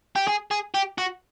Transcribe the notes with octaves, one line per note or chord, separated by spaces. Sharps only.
G4
G#4
G#4
G4
F#4